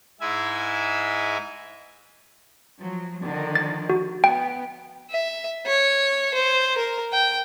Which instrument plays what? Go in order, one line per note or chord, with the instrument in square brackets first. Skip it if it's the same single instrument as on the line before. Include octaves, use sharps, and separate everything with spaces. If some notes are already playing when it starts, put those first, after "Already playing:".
[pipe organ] G#2 G#3 E4 E5 G#5
[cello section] F3 F#3
D3 D#3 F3
[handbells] A6
F#4
[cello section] B3 [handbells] G5
[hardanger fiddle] E5
C#5
C5
A#4
G5